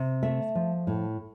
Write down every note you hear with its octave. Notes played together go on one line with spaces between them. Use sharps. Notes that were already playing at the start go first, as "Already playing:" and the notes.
Already playing: C3
A3 E5
F3
A2